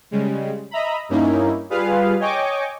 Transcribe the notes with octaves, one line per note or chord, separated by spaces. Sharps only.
C#3 G3 G#3
D#5 E5 A#5 B5
G2 A#3 C#4 D#4 E4
G3 F4 G#4 B4 F5
C#5 D#5 G5 G#5 C#6 D6